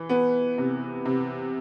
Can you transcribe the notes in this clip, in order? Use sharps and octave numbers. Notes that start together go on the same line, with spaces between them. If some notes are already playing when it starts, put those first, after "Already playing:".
Already playing: E3
B3
C3
C3